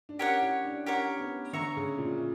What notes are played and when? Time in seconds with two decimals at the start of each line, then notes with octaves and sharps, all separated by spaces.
0.09 D4
0.19 C#4 G4 A#4 C#5 F#5
0.42 E4
0.64 D4
0.86 C#4 G4 A#4 C#5 F#5
1.20 B3
1.53 D3 C#5 E5 A#5 C#6
1.77 C#3
1.98 A#2